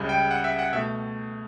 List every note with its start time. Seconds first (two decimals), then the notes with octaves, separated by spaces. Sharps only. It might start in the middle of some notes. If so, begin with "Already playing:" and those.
Already playing: C#2 C#3 G3
0.09 G5
0.31 F#5
0.44 E5
0.59 F#5
0.73 B2 A3 E5